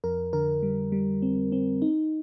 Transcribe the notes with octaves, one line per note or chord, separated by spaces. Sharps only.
F2 A#4
D3 A#4
G3
G3
C4
C4
D#4